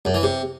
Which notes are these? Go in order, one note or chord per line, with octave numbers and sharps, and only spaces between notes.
F#2
E3
C3